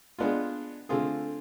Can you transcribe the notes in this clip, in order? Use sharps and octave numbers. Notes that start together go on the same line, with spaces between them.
G#3 B3 D4 F4
D3 A3 C4 F4 G#4